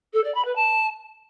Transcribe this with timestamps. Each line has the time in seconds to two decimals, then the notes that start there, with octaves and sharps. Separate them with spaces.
0.13 A4
0.24 D5
0.34 B5
0.45 B4
0.55 A5